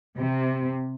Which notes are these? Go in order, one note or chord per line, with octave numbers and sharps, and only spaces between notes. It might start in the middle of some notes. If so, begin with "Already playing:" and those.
C3